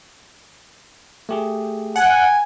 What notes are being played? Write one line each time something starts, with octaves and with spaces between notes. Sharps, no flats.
A3 G4 G#4
F#5 G#5